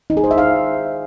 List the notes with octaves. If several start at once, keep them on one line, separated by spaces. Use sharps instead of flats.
D#4
G#4
C5
E5
F5